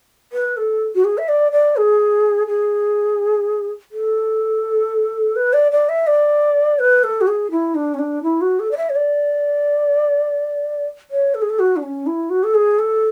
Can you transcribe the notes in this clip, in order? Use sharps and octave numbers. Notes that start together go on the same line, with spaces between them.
B4
A4
F#4
G#4
E5
D5
D5
G#4
G#4
A4
B4
D5
D5
E5
D5
B4
A4
F#4
G#4
E4
D4
C#4
D4
E4
F#4
A4
D5
E5
C#5
D5
C#5
A4
G#4
A4
F#4
D4
C#4
E4
F#4
A4
G#4
A4